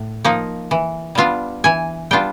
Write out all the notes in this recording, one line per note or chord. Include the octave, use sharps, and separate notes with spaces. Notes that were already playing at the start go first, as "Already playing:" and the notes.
Already playing: A2
F3 A#3 D#4
E3
G3 B3 D4 F4
E3 G#5
G3 B3 D4 F4 G5